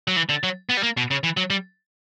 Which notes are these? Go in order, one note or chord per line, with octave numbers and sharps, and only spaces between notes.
F#3
E3
D3
F#3
B3
G3
A#3
B2
C#3
E3
F#3
G3